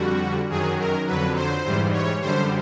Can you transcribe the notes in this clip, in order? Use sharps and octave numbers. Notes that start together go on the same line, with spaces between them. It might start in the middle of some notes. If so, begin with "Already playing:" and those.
Already playing: F2 D3 G3 F#4
F#2 D#3 F#3 G#4
A#4
F2 D3 F#3 B4
C5
G#2 E3 G3
C#5
F#2 D3 G3 C5